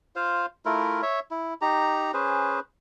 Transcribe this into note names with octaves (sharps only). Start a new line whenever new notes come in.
F4 C5 F5
A3 E4 F4 A#4
C#5 E5
E4
D#4 G4 A#5
C#4 G#4 B4 C5